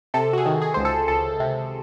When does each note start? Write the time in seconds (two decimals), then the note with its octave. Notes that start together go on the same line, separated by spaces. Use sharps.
0.14 C3 A4
0.33 F#4
0.38 G#4
0.46 D#3
0.62 G#4
0.74 C#2 C5
0.85 A4
1.08 C#2 A4
1.40 C3